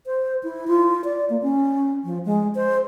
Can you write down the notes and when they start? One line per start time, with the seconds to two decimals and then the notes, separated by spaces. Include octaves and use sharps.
0.06 C5
0.43 E4
0.67 F4
1.04 D5
1.30 A#3
1.42 C#4
2.04 F3
2.25 G#3
2.55 C5